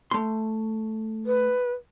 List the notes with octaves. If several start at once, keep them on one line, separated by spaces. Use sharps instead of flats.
A3 C6
B4